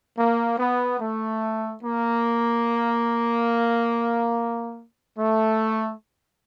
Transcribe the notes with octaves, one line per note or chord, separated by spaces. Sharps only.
A#3
B3
A3
A#3
A3